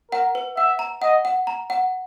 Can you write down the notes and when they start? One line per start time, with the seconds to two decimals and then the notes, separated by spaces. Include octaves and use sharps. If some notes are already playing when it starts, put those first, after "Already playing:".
0.12 A#4 F#5
0.35 B4
0.57 E5 F#5
0.79 A#5
1.02 D#5 F#5
1.25 F#5
1.47 A#5
1.70 F#5